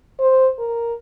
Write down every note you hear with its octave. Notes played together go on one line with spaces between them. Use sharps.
C5
A#4